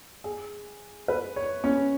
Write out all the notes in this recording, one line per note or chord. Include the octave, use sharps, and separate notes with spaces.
G#4
B4
C#5
C#4